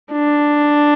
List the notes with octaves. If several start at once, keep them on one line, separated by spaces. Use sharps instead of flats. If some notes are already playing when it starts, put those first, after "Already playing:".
D4